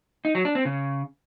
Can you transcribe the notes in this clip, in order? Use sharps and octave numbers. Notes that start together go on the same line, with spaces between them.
D#4
F#3
D4
C4
C#3